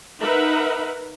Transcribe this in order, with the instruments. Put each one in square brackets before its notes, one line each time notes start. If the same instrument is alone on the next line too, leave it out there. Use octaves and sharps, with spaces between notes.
[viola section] D#4 A#4 B4 E5 F#5 B5